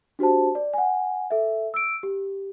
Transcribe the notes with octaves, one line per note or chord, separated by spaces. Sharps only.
D4 F#4 G4 C5 A5
D5
F#5 G#5
A4 E5
E6 D7
G4